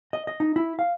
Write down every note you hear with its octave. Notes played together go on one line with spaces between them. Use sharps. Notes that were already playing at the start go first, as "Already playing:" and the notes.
D#5
D#5
D#4
E4
F5